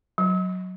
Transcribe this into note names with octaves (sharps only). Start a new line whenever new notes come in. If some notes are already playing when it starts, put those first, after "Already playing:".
F#3